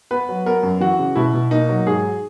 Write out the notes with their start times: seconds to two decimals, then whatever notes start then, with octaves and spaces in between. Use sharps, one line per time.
0.11 B3 B4
0.29 F#3
0.46 B3 A#4
0.63 F#2
0.81 E3 F#4
0.99 C#3
1.16 B2 E4
1.34 B2
1.51 A#3 D#4
1.69 F#3
1.86 G#2 G#4